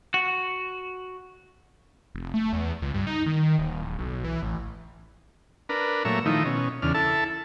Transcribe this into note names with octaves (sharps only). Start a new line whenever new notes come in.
F#4
F1
A3
E2
C#2
G2
D#4
D#3
D#1
D1
B1
E3
A1
D4 A#4 B4
A#2 F#3 A3 C#5 E5 A#5
D#3 F3 A3 D#4 E4
B2 C#4
E2 C#3 D4 F6
E4 A4 A5